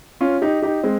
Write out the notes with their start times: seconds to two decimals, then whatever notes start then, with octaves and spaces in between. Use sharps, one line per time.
0.21 C#4 F4
0.42 D#4 G4
0.62 D#4 G4
0.84 G#3 C4